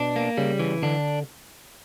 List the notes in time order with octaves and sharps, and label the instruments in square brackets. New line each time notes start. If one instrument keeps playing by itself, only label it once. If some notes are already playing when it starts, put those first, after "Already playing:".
Already playing: [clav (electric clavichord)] B2 [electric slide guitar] D4
[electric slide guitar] A#3
[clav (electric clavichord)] C#3 [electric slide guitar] G3
[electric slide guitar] E3
[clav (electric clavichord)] D3 [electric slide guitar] D4